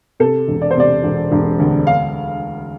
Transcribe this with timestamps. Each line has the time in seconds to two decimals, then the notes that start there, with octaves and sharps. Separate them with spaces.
0.20 C3 A4
0.48 E1
0.62 D5
0.71 C5
0.76 C3 D5
1.03 E1
1.32 E1
1.59 D2
1.87 F5